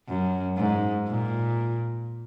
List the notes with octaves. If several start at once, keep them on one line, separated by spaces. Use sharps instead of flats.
F#2
G#2
A#2